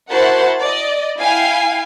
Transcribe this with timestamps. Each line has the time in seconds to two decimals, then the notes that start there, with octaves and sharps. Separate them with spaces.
0.11 E4 F#4 A#4 C5 F#5 A5
0.62 D5 D#5
1.20 E4 F5 G5 G#5 C7